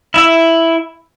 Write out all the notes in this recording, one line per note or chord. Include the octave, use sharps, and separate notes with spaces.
E4 E5